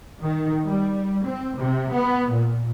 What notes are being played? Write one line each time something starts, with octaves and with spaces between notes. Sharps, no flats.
D#3
G3
C4
C3
B3
A#2